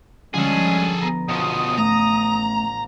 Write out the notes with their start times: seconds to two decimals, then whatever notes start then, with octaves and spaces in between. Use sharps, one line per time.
0.34 D3 F3 G3 G#3 C#4 G#4 A4
1.01 B3 A#5
1.29 B2 F3 C#4 D#6
1.78 A1 A3 A#5